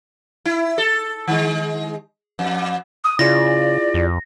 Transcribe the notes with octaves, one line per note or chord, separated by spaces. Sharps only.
E4
A4
D#3 G#3
F2
D#6
C#3 E4 F4 G#4 D5 A#6
F2